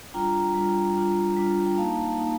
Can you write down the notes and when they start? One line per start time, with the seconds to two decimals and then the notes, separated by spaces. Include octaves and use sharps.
0.14 G3 D4 F4 G5 A#5
0.55 G3 D4 F4
0.96 G3 D4 F4
1.37 G3 D4 F4
1.66 G5
1.77 A#3 D#4 F5 A5
2.18 A#3 D#4